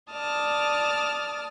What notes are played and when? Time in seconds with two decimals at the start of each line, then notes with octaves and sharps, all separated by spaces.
0.11 D5 A5 D#6 F6